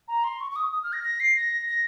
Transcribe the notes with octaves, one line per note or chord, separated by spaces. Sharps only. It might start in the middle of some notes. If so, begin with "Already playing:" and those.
A#5
C6
C#6
C#6
D#6
D#6
F6
A#6
A#6
C7
A#6
A#6